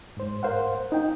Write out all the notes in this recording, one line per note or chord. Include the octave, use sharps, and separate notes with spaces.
G#2 C5
A#4 C5 F5 F#5
D#4 G5